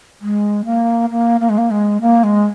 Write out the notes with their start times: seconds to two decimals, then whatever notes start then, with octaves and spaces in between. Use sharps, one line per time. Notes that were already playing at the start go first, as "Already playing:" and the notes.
0.21 G#3
0.65 A#3
1.11 A#3
1.41 A#3
1.50 G#3
1.58 A#3
1.71 G#3
2.01 A#3
2.24 G#3